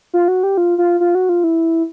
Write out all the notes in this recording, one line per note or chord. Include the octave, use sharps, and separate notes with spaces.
F4
F#4
G4
F4
F4
F4
F#4
F4
E4